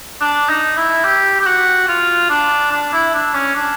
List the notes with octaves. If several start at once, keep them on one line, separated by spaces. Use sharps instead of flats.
D4
D#4
E4
G4
G4
F#4
F4
D4
D4
E4
D4
C#4
D4